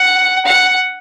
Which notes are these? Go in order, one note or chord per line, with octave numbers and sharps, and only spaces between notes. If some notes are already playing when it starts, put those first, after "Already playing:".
Already playing: F#5
F#5